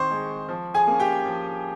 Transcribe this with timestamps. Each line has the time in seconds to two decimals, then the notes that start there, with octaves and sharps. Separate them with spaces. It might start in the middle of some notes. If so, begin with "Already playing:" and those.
Already playing: D#3 C4 C5 C6 C#6
0.11 G#3 C4
0.49 F3
0.74 G#4 G#5
0.87 A#3 C#4
1.00 G4 G5
1.26 F3